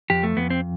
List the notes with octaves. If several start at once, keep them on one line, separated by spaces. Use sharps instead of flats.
F2 G4
A3
F2 B3
C4